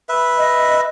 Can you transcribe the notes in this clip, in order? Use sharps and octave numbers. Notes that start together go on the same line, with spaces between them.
B4 E5
D#5